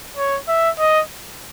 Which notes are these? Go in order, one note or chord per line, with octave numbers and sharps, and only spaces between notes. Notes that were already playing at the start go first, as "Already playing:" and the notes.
C#5
E5
D#5